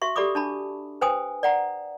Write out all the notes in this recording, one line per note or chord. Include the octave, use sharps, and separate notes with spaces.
F#4 E5 C#6
G4 A4 D5 B5 D6 D#6
D4 A5 B5
B4 C5 G5 G#5 D#6
D5 F#5 A#5